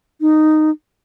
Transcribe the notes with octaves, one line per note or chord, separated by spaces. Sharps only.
D#4